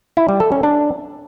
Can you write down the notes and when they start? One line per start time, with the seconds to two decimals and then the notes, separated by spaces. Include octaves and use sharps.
0.17 E4
0.29 G3
0.40 A4
0.52 C#4
0.63 D4